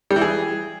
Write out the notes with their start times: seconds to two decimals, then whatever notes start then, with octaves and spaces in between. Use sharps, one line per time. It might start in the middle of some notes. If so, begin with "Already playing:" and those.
0.11 G3
0.16 E3
0.21 G#4